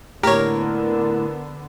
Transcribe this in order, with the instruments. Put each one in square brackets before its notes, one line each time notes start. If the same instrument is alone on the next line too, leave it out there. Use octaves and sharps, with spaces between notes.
[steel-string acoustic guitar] A2 A#3 [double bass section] D3 B3 [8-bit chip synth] G4 C#5 [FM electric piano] A#4